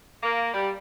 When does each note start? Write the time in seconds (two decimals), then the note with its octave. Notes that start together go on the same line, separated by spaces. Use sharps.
0.23 A#3
0.54 G3